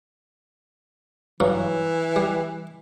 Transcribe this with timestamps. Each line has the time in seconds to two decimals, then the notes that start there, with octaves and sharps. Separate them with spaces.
1.40 G2 E3 F#3
2.16 G3